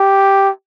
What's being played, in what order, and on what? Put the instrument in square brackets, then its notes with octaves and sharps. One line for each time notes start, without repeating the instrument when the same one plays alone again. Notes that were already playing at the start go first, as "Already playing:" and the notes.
Already playing: [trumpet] G4